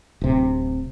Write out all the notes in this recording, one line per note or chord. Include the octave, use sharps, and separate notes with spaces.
D1 C3